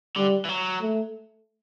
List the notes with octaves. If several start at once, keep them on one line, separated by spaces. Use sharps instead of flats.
D3 G3
E3
F#3
A3